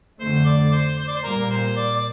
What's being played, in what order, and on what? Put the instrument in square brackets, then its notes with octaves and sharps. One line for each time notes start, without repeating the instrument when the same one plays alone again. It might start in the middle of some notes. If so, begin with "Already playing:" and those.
[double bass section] F2 D3 A3 [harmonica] C5
[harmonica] D5
C5
C5
D5
C5
[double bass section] A#2 G3 A#3 [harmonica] A#4
[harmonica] C5
D5
D5